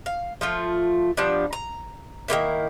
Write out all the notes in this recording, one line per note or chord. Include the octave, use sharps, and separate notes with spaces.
F5
F3 A3 F4
F3 G3 B3 D4
A#5
D#3 F#3 A#3 E4